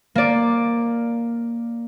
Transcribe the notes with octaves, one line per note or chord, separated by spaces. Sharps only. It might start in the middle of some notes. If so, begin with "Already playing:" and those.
A#3 D5